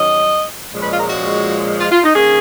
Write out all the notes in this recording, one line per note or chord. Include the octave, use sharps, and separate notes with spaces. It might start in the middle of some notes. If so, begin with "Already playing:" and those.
Already playing: D#3 F#3 C#4 D#5
A#2 F3 G#3 C#4
B4
F4
A#4
F#4
F4
F4
D#4
D#3 A#3 C#4 G#4